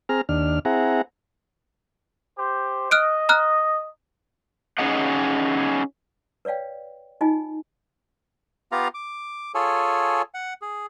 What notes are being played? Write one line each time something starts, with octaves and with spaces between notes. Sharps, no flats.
C4 G#4 A#5 F6
D#2 D4 F6
C4 E4 G#4 F#5 A#5
G4 C5
D#5 F6 F#6 D7
A#5 F6 F#6
C#4 D#4 G#4 D#5 F#5
B4 C#5 D5 F5 G5
D#4 F4 D#5 G#5
B3 F4 G4 F5 A#5
D6
F4 G#4 A4 C#5 G#5
F#5
G#4